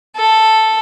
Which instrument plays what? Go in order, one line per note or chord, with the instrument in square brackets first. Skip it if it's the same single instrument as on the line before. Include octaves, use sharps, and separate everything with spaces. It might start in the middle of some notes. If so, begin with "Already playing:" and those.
[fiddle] A4